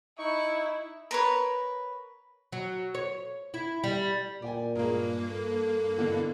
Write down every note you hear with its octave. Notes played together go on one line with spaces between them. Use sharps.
D#4 E4 C#6
A#4 B4 C#5
F#3
C#5
E4
G3
A#2 D5 G5 G#5
G2 G#3 A#3 G#4 A#4
A4
B2 D3 E3